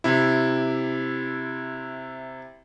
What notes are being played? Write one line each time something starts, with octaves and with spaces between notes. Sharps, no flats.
C3 E4